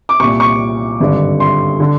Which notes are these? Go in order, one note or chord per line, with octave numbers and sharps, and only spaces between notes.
D6
C2 A#2 C#6
C#6
G#1 G2 D3
C6
D3